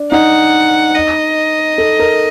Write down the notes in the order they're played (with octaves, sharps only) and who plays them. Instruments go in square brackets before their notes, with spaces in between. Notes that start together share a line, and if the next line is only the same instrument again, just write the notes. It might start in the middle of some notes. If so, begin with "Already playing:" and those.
Already playing: [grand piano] D4
[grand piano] D#4 [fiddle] F#5
[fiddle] D#5
[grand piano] A4
A#4